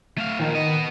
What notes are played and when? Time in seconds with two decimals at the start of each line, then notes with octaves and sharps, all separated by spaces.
0.18 A3 F5
0.39 A#2 D#3 F3
0.55 B3 D#5